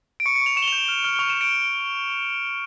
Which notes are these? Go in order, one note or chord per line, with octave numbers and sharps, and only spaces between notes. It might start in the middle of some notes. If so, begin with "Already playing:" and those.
D7
C#6 C#7
C#7
C#6 F7
C#6 E7
G7
F7
G6
E7
F6
F6
C#6 F7
E7
C#6
D7